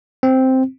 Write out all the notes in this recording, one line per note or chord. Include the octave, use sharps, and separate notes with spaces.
C4